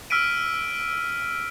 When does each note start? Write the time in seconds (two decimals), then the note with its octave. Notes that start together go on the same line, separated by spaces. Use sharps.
0.10 E6 F6 B6 D7 D#7